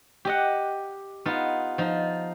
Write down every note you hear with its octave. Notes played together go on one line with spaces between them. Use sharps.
G4 D#5 F#5
B3 D#4 F4
F3 D#4